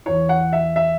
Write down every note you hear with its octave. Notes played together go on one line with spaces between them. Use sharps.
E2 E3 C#5
F#5
E5
E5